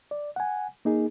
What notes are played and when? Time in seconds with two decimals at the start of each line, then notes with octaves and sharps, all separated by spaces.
0.11 D5
0.36 F#5 G#5
0.85 A#3 D#4 G#4